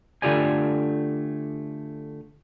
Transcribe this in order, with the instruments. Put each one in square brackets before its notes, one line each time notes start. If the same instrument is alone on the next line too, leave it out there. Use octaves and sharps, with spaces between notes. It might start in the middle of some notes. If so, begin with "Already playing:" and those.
[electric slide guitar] D3 A3 F4 G4 D5 G#5